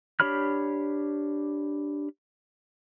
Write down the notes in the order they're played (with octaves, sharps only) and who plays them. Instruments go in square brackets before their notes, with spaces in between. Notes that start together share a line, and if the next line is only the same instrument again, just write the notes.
[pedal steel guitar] D4 G4 C#5 B5 F6